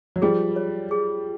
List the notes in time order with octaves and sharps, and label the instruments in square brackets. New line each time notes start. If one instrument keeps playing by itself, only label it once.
[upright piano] F#3
[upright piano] F3 G3 [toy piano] G#4
[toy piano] C#5
G#4